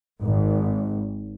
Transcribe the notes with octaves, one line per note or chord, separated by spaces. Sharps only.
G#1